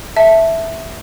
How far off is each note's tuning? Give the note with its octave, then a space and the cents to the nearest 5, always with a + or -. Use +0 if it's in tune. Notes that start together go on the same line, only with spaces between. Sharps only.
E5 +0 A5 +0